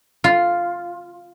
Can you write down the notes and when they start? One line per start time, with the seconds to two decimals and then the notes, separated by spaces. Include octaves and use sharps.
0.24 F4